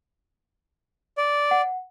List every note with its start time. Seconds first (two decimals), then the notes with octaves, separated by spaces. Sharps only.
1.17 D5
1.51 F#5